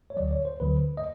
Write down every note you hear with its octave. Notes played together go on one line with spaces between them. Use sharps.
C#5
D2 D3 F#3 D5
C#5
C5
D2 D3 F#3 B4
D#5